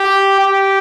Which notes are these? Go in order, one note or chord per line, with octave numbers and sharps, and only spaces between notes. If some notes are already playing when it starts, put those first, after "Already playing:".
Already playing: G4
G4